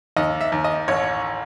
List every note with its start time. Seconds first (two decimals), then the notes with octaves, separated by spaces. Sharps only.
0.17 D#2 D#5
0.41 E5
0.52 D#2
0.64 D#5
0.88 A1 C#5